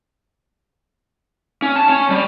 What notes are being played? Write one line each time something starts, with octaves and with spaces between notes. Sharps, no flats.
C#4
A5
C#4
G3